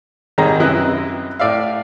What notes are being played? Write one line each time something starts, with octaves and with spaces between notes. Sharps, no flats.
G#1 D#3 G3 D#4 G#4 A#5
F#2 C3 E4 B4 D#5 F#6
A2 D5 E5 F5